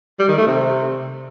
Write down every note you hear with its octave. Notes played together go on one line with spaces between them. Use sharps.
G3
D#3
A3
C3